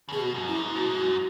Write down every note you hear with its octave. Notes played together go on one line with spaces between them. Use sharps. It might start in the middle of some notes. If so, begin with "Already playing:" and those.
C#3
B2 G#4
F#4
F#2
E4
G#2
B2 F#4
G#2
F#2